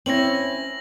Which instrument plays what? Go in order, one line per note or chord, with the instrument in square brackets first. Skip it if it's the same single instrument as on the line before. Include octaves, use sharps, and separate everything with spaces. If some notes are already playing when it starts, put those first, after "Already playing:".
[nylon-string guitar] C4 C#4 E4 [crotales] A#6 F#7